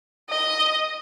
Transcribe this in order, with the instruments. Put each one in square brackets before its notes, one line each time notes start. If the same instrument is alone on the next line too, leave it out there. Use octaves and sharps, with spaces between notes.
[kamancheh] D#5